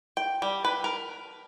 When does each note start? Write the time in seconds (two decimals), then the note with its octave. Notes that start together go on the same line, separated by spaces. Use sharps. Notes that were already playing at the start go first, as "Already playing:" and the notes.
0.17 G5
0.42 G3
0.65 B4
0.84 A#4